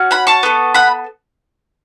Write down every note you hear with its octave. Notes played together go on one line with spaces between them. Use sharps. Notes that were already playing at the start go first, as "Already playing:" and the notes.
Already playing: C#4 F#4
F#5 B5
A5 C#6
B3 A4
F#5 B5